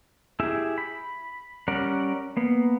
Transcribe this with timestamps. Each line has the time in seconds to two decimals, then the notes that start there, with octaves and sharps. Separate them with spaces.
0.40 E4 G4 G#4 E5
0.78 B5
1.68 G3 C#4 A#4 D5 F#5
2.37 A#3 B3